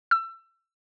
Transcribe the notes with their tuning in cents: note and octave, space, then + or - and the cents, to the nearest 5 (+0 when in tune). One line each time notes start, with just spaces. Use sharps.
E6 +30